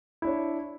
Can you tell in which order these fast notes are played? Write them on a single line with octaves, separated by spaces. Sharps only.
E4 D4 C#5